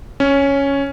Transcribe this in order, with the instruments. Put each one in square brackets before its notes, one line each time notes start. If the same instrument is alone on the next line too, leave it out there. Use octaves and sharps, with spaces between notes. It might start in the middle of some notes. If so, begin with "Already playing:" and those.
[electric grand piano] C#4